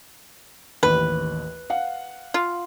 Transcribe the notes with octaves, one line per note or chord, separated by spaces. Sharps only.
A1 D#2 B4
F5 F#5
F4